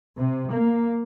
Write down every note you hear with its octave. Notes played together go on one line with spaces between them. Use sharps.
C3
A#3